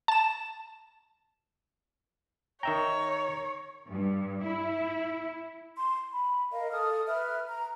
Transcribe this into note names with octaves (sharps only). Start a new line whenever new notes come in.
A5 E7
D#3 C#5 E5 G5 A#5
G2
E4
C6
B5
A#4 D#5 F5
A4 D#6 F6
B4 E5 F6
A#5